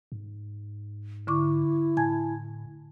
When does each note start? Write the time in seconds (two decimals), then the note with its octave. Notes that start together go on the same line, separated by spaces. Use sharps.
0.12 G#2
1.27 D3 E4 C#6 D6
1.97 A2 G#5 A5 G#6